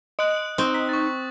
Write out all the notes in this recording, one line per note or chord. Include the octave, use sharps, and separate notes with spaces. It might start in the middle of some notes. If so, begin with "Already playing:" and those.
D#5 D#6 F#6 D7 F#7
C4 D#4 C#6
B6
C#6 A6